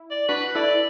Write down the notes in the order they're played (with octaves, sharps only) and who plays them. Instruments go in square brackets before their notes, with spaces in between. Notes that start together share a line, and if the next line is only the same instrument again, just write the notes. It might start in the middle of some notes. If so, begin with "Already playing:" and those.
Already playing: [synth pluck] E4
[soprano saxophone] D5
[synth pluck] D4 F#4 [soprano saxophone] B4
[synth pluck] E4 A4 [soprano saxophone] D5